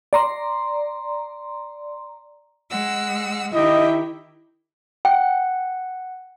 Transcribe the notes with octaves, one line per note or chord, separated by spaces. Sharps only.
D5 A#5 C6
G#3 F#5 E6
D#3 E4 G4 D#5 E5
F#5 G5